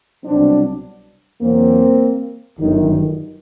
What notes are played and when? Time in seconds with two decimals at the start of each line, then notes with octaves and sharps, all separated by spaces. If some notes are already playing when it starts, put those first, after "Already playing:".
0.24 C2 B2 F#3 C4 D4
1.41 E2 B2 F#3 A#3 C4
2.57 G1 F#2 D#3 F#3